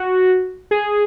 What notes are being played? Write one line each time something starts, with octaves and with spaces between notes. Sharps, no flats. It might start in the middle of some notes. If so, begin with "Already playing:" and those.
Already playing: F#4
G#4